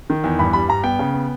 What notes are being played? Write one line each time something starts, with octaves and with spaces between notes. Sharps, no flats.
D#3
E2
G2 B5
G3 B5
G2 A#5
B3 G5
C#3
B3